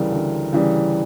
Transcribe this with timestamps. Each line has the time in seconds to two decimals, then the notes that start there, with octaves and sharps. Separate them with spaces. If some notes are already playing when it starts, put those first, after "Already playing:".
Already playing: D2 C#3 E3 G3 A#4
0.12 D2
0.53 C#3 E3 G3